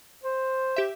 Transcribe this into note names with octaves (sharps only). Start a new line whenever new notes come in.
C5
G4 E5